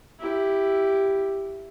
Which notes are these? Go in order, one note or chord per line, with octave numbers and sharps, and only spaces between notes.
E4 G4